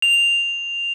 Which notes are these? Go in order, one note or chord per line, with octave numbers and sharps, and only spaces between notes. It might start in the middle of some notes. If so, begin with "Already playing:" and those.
F7